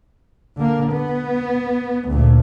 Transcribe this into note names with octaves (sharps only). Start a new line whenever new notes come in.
D3 A#3
B3
D2 A#2